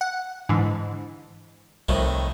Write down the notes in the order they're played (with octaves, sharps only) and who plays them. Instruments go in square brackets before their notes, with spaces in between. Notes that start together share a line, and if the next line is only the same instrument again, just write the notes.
[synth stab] F#5
G#2 D3 E3
[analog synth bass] C2 [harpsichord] F2 A2 D#3